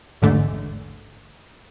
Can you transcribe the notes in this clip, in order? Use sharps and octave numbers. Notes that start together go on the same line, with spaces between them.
A1 E2 G#2 D3 A3